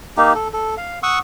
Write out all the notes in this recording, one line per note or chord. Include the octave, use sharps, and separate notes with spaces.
A#3 D#4 G4
A4
A4
F5
F#5 C#6 D#6 E6